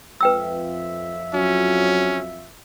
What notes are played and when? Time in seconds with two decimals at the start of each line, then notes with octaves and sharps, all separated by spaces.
0.21 F2 F4 B4 E5 G5 E6
1.34 F#3 C#4